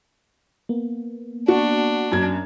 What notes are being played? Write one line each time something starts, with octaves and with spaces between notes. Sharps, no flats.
A#3 B3
D4 F#4
F#2 G#6